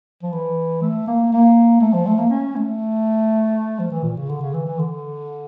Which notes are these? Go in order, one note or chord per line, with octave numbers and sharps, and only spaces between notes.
F3
E3
A3
A#3
A#3
A3
F3
A3
A#3
C#4
A3
F3
E3
A#2
C#3
D3
C#3
E3
E3
D3